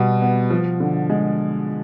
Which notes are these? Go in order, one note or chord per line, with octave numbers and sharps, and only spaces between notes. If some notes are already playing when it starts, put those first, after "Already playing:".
Already playing: B2 G3
B3
F3
D3
G#3